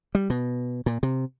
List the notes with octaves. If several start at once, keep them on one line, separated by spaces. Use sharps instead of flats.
G3
B2
A#2
C3